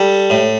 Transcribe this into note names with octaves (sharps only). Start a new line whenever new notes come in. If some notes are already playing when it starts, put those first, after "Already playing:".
Already playing: G3 A4
A2